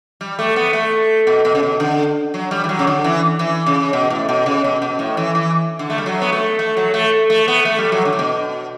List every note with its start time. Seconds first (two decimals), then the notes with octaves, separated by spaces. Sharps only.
0.21 G3
0.39 A3
0.56 B3
0.73 A3
1.27 B2
1.45 B2
1.55 C#3
1.63 B2
1.80 D3
2.34 F#3
2.51 G3
2.64 E3
2.69 F#3
2.79 C#3
2.87 D3
3.04 E3
3.39 E3
3.66 C#3
3.93 B2
4.10 A2
4.29 B2
4.46 C#3
4.64 B2
4.82 B2
4.99 A2
5.17 E3
5.35 E3
5.79 D3
5.90 A3
5.98 G3
6.06 F#3
6.22 B3
6.32 A3
6.59 A3
6.77 F#3
6.94 A3
7.30 A3
7.48 B3
7.65 A3
7.78 G3
7.92 F#3
8.05 D3
8.13 A2
8.19 B2